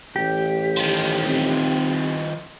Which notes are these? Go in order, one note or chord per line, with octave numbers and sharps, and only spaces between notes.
A1 G4
D#3 F3
C4